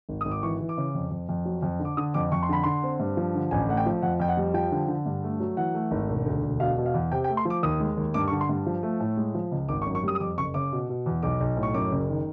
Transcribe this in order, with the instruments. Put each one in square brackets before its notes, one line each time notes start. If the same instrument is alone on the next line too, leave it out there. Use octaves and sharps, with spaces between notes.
[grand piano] G#1
G#1 D#6
D6
E3 C#6
E3
D6
C#3
F2
F2
F2
F#3
F2
D3
D6
D3 D#6
F2 D6
F2 C#6
C6
D3 B5
D3 C6
C4
G2
F3
D3
A1 G#5
A3 F#5
G5
F3
F2 F#5
F2 G5
F#5
G3
F3 G5
D3
D3
G2
A3
F#3
E3 F#5
A3
G#1
E1
D2
E1
B2 F5
B2
F5
E2
C3 G5
G5
A3
C6
F3 D6
D#2 D#6
G#3
D#2
G2 D6
C#6
D3
C6
G2
F3
A3
A2
G#3
F3
C#2
G#1 D6
C#6
F#2
C#6
G3 D#6
D#6
F2 D6
F#1 C#6
C#3 D6
B2
B2
E2
B1 D6
B1
A2
C#6
F#2 D6
F#1
D#3